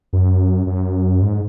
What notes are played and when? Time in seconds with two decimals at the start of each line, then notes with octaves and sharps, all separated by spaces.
0.13 F#2
0.67 F#2
1.22 G#2